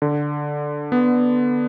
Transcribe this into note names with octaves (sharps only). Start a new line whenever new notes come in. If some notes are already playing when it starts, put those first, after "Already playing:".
D3
B3